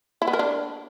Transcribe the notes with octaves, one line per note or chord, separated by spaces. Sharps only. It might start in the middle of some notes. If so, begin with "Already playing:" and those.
E4
B3
A#4
D4